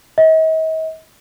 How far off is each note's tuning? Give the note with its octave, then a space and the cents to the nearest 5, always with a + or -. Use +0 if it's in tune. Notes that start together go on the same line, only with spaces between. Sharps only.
D#5 +45